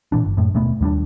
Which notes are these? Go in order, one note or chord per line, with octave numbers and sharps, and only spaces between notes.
A#2 E3 D4
G1
F#2 A2
D#1 B2 A3 B3
D#2 G3 B3 D4